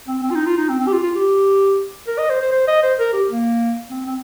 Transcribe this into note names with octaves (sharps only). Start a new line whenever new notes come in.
C4
C4
F4
D#4
F4
D#4
C4
C4
G4
F4
F4
G4
A#4
D#5
C5
C5
C5
D#5
C5
A#4
G4
A#3
C4
C4